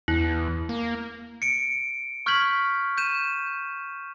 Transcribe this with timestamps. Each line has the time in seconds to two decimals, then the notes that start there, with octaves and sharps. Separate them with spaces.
0.08 E2 E4
0.69 A#3
1.42 C#7 D7
2.26 C#6 F6 G6 G#6 B6 F#7
2.98 G6 D#7 E7